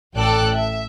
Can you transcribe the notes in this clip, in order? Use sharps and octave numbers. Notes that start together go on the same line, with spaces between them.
A1 A4 D5 G5 F#6
E5